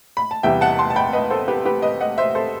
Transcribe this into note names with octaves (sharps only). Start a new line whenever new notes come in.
B5
A5
E2 C3 E3 G3 E5 G5
F#5 A5
A5 C6
A5
G5 B5
B4 D#5
A4 C5
G4 B4
G4 B4
B4 D#5
D#5 F#5
C5 E5
A4 C5